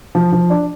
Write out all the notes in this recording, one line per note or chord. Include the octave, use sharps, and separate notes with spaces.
F3
F3
D4